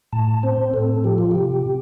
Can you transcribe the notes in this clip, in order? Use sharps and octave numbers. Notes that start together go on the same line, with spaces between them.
A2 A5
C4 C5
A2 A4
F3 G4
F4
C3 G4